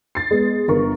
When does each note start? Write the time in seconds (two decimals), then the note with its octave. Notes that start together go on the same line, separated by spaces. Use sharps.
0.15 A6 C7
0.31 G#3 B3
0.68 G1 A#4 C#6